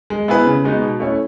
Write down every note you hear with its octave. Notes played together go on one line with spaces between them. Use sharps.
G#3
B3 E4 G#4 B4
C#3
G#3 B3 D#4 F#4
B2
A3 C#4 E4